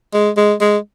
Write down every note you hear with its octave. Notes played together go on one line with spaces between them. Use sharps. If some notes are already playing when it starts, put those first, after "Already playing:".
G#3
G#3
G#3